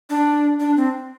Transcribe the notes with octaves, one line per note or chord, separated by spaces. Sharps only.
D4
D4
C4